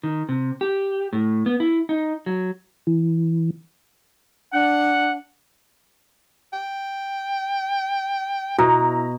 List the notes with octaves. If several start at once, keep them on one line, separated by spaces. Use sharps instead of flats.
D#3
C3
G4
A2
B3
E4
D#4
F#3
E3
D4 F#5
G5
B2 E4 A#5